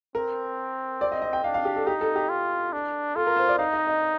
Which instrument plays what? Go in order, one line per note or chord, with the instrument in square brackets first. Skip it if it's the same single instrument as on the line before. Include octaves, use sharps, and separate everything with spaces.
[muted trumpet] C4 [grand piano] A#4
[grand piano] D5
D#5
D#5
G5
[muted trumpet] D4 [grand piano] F5
[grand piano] F5
G4
A4
[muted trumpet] D#4 [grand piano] G4
[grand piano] A4
G4
[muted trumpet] F4
D4
[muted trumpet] F4 [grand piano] A4
[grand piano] A#4
C5
D5
[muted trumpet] D#4 [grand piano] F5
[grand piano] D#5
D#5